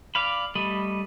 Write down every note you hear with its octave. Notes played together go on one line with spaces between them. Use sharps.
D5 F5 B5
G3 A3 D#5 B5